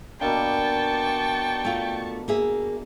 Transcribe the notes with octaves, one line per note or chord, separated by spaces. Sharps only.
B2 A#3 D4 G5 A5 C#6
A3 F4
A#3 G#4 E5